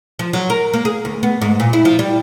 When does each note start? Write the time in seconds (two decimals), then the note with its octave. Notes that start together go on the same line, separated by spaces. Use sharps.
0.19 F3
0.33 F#3
0.50 A#4
0.74 A#3
0.85 G#4
1.05 D2
1.23 B3
1.42 G#2
1.60 A#2
1.73 E4
1.85 F3
1.99 G3